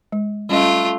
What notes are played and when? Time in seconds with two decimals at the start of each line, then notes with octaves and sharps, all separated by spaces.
0.12 G#3
0.49 G3 A3 C#4 F4 D#5